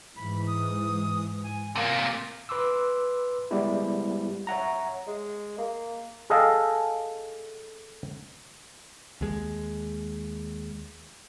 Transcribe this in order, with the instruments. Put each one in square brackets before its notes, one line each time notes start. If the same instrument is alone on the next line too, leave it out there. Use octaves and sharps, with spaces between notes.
[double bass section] G#2 E3 [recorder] B5
[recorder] D#6
G#5
[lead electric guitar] C3 A#3 [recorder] A#4
[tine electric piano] B4 C6 D6 E6
G3 G#3 B3 E4 G4
C#5 E5 F#5 A#5
[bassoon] G#3
A#3
[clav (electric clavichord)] G#4 A4 D#5 F5 G5
[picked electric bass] D#2 G#3